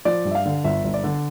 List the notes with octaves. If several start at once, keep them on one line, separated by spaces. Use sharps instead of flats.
F3 D5
G2
E5
F5
D3
G1 E5
G1
D5
D3